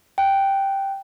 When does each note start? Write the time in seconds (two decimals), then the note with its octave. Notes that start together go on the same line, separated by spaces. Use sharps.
0.18 G5 F#6